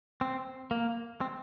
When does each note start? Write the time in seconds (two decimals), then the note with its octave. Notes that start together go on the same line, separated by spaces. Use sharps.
0.21 C4
0.71 A#3
1.21 C4